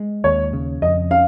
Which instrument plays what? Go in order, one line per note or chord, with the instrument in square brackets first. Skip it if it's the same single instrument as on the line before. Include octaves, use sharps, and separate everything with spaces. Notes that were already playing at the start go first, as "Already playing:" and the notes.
Already playing: [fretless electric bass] G#3
[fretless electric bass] D#2 [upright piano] C#5
[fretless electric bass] C#3
[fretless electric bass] F2 [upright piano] D#5
[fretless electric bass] C#4 [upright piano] F5